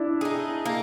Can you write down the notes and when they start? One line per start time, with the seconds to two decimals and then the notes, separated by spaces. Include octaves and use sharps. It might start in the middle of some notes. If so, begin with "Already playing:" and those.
Already playing: D4 E4
0.21 D#4 G#4
0.66 A#3